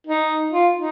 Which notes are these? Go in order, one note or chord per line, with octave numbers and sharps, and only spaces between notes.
D#4
F4
D#4